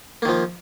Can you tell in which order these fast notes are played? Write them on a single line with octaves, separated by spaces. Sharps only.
A#3 D#3 F3